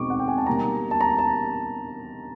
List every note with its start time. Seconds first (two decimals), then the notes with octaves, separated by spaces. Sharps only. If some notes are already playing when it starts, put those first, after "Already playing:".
Already playing: B2 G#3 C4 D#4 C#6 D6
0.10 F#5
0.20 G5
0.28 G#5
0.38 A5
0.46 B2 G3 A#3 D#4 A#5
0.91 A5
1.01 A#5
1.19 A5